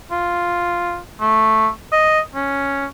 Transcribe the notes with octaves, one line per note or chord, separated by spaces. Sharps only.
F4
A3
D#5
C#4